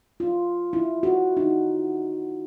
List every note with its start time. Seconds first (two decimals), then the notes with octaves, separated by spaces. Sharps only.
0.20 F4
0.73 E4
1.03 F#4
1.37 D#4